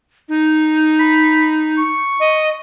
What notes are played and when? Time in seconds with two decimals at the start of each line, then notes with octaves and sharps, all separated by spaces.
0.29 D#4
0.99 B5
1.78 C#6
2.20 D#5